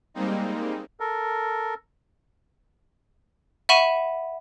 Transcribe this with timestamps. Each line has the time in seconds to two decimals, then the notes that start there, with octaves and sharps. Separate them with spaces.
0.14 G3 G#3 A#3 C4 D#4
1.00 A4 A#4
3.69 E5 F#5 B5 C#6 D#7 E7